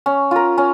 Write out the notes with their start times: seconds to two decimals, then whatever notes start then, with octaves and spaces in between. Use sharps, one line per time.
0.06 C#4
0.31 F4 A#4
0.58 C#4